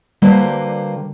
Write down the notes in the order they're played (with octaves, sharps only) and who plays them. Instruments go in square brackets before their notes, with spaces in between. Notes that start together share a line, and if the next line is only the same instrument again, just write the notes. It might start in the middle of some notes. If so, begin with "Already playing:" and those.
[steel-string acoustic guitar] D3 G3 A#3 F#4 B4 C5